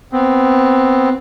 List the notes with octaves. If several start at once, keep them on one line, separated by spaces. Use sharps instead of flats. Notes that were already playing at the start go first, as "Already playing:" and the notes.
B3 C4